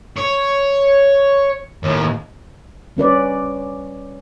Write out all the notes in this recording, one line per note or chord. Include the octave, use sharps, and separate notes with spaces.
C#5
D#2 A2
G3 C#4 B4 D5